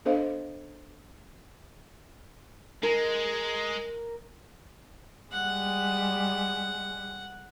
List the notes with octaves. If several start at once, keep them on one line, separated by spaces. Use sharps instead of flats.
B3 D4 A4 C5 D#5 F5
G#3 A#4
G3 G#3 F#5